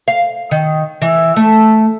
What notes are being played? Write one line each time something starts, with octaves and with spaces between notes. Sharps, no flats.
F5
D#3
E3
A3